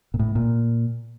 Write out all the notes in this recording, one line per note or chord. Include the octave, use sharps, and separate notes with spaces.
A#2
A2
A#2